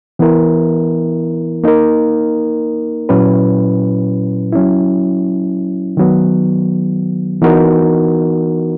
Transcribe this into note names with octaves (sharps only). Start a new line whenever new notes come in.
E3 B3 E4 A#4
A#3 D#4 A#4
A#2 F#3 C#4 E4 B4
F#3 C#4 E4
D#3 F#3 B3
E3 B3 D#4 F#4 A#4